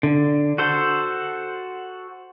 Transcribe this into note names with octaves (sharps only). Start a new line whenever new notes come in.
D3
F#4 A4 C5